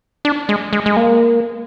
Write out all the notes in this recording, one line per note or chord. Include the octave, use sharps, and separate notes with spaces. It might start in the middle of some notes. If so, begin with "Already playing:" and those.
D4
G#3
G#3
G#3
A#3